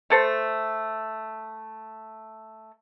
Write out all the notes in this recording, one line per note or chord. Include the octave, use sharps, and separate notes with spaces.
A3 A4 C5